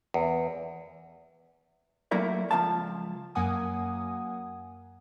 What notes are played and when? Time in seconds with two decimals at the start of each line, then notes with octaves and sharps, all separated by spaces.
0.14 E2
2.11 F#3 A3 A#3 E4 A#4 D5
2.51 C#2 C#3 F3 F5 A5
3.35 F#2 F#3 A#3 F#5 G#5 D#6